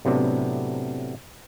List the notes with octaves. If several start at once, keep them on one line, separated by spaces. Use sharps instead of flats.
A2 C3 F#3 B3 D4